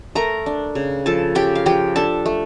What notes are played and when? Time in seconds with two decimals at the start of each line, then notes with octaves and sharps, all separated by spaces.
0.15 A3 A#4 A#5
0.46 D4
0.75 C#3
1.06 F3 A4 A5
1.35 C#3 G4 G5
1.55 F5
1.66 F3 G4 G5
1.96 D4 A4 A5
2.26 A3